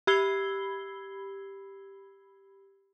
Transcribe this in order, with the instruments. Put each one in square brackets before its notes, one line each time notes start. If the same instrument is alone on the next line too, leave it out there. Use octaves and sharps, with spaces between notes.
[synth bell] G4 B5 E6 G#6 C7 G7